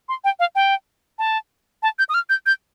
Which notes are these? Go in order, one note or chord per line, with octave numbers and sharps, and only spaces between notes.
C6
G5
F5
G5
A5
A5
G6
D#6
F6
G6
G6